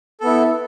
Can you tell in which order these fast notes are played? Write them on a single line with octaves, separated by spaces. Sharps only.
A4 B3 E4